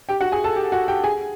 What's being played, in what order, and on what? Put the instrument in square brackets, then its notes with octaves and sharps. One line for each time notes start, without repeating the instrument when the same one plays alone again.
[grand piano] G4 G5
F#4 F#5
G#4 G#5
A4 A5
G4 G5
F#4 F#5
G4 G5
G#4 G#5